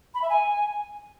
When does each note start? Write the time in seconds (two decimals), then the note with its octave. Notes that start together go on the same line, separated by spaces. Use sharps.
0.14 B5
0.22 E5
0.30 G#5